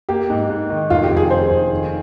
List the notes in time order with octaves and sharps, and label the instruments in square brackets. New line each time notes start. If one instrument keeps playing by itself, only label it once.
[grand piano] A#3 [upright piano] G4
[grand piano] G#2
G#2
D#3
[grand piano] F1 [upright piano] F4
[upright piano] G4
[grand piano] F1
[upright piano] G#4
[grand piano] D#3 [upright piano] C5
[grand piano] F1
D#3